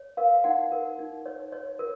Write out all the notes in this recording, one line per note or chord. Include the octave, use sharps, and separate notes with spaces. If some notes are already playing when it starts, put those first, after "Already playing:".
Already playing: C#5
A#4 F5
D#4 F#5
A#4
D#4
C#5
C#5
A#4